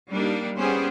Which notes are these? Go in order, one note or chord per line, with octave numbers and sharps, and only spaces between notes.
G3 A#3 D4 D#4 G4
G3 B3 C#4 G4 G#4 C5